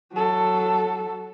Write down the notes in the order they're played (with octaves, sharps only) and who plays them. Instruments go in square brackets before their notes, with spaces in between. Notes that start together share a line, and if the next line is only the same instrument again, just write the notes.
[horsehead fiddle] F#3 A4